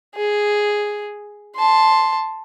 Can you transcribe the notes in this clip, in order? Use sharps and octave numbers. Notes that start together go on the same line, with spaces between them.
G#4
A5 C6